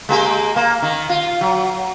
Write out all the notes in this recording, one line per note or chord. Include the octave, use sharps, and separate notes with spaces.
G#3 A#3 G4
A#3
D#3
F4
F#3